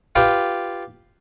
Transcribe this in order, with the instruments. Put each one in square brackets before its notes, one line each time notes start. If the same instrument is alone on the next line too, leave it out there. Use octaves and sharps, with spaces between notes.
[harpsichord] F4 G4 B4